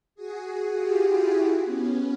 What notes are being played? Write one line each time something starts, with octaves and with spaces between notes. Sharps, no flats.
F#4 G#4
F4 G4
E4 F#4
E4 F#4
B3 C#4